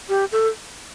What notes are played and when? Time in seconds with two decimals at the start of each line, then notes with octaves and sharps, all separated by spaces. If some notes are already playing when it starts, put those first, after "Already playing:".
0.09 G4
0.32 A4